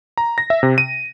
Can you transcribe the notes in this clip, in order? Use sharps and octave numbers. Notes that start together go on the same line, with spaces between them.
A#5
A#6
E5
C3
D#7